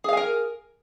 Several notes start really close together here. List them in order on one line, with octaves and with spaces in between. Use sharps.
G#4 F5 G#5 A#4